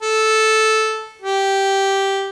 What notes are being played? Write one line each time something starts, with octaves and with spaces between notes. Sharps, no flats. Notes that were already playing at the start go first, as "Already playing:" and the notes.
A4
G4